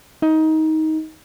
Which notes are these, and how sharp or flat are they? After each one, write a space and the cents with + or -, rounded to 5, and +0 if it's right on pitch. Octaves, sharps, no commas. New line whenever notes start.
D#4 +20